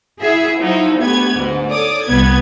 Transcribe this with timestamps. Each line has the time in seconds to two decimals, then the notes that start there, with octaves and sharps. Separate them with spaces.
0.21 E4 F#4 G#4 E5
0.59 F3 F#3 D#4 E4 F#4
0.98 D2 A3 B3 G4 B4 G#6
1.34 D2 G#2
1.68 A4 C#5 D5 D6 D#6
2.05 C2 B3 B4 G#6